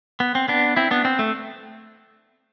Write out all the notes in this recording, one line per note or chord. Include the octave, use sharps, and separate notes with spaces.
B3
C4
B3 D4
C4 E4
B3 D4
C4
A3